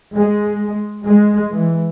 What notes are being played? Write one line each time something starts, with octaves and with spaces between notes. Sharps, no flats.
G#3
G#3
E3